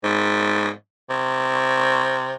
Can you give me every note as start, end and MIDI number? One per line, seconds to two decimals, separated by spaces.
0.04 0.70 44
1.10 2.32 48